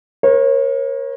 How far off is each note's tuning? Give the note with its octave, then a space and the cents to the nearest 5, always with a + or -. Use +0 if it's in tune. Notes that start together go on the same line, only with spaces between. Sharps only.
A#4 +25 C#5 -35